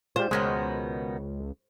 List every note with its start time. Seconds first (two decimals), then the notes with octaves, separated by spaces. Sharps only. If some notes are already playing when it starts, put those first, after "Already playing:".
0.16 G#3 F4 G4 C5
0.31 C#2 B2 D#3 G#3 B3 C#4 A#5